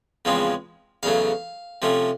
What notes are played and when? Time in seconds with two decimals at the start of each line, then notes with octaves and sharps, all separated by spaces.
0.25 E2 C#3 F3 G#3 C4
1.03 E2 C#3 F#3 A3 F5
1.82 C3 F3 A3 C#4